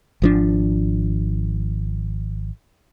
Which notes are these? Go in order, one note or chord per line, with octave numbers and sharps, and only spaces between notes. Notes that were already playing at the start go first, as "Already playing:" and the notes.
G#1 F3 D4